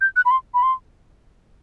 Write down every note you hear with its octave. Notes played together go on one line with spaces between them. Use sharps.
G6
F#6
B5
C6
B5
C6